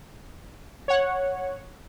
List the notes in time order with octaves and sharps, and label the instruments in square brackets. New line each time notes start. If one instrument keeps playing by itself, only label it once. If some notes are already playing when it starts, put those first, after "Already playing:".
[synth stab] C#5 F#5